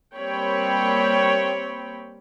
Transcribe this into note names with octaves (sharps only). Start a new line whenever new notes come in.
G3 A#3 C4 C#5 G5 B5